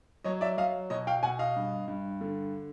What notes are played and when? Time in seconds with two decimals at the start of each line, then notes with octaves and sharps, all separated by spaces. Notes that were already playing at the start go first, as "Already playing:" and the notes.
0.24 F#3 C#5 D#5
0.41 D5 E5
0.57 F#3 D#5 F5
0.90 B2 C#5 D#5
1.07 F5 G5
1.23 B2 F#5 G#5
1.39 D#5 F5
1.56 G2
1.88 G2
2.21 D3